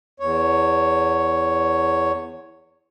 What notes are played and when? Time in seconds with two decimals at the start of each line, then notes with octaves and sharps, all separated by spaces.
0.20 E2 C#5